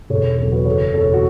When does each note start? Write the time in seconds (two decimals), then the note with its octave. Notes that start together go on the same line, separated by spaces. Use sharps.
0.10 E1 A4 C#5
0.38 E2 C#3 F#3 A4
0.52 F#4 B4
0.66 F#1 A4 C#5
0.94 E2 B2 B3 A4 C#5
1.14 F#4